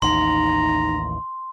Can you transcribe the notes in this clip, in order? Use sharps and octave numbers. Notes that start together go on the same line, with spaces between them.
A1 D#2 D#4 A#5 C6